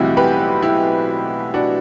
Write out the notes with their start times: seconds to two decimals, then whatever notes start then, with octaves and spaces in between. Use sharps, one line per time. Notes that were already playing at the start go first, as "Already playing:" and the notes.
Already playing: B1 A2 E3 G3 C4 E4 F#4
0.17 G4 B4
0.62 E4 G4
1.54 D4 F#4